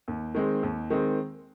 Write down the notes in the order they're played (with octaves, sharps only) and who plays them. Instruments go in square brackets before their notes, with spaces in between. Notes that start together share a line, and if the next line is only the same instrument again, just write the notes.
[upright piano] D#2
D#3 G#3 C4
D#2
D#3 G#3 C4